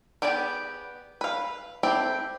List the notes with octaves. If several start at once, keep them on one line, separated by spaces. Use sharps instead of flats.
B3 G4 G#4 D5 G5
B4 F5
C4 E4 G4 A4 C5